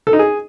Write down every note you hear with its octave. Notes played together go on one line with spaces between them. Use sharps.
A4
D#4
G#4